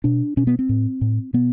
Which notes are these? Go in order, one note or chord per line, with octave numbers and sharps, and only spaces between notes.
B2 D4
B2 C#4
B3
C4
A2
A2
B2 B3